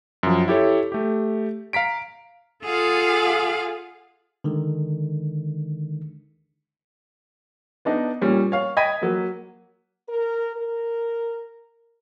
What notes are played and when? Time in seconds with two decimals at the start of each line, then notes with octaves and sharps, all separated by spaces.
0.23 F#2 F3
0.48 E4 G4 A4 C#5
0.92 A3 G4
1.73 F5 A#5 B6 D7
2.64 F4 G#4 A4 F5 F#5
4.44 D3 D#3 G#3
7.85 B3 D4 D#4
8.21 A#2 G3 C#4
8.52 C#5 F5
8.77 D#5 G5 B5 G#6 B6 D#7
9.01 F#3 A#3
10.09 A#4
10.56 A#4